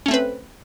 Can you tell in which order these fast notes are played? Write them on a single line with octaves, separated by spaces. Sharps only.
C#4 A3 C4 B4